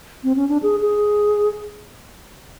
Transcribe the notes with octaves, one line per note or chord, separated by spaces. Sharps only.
C4
C#4
D4
G#4
G#4